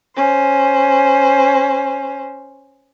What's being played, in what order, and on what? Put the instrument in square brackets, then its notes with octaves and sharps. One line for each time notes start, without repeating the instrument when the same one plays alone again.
[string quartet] C#4 C5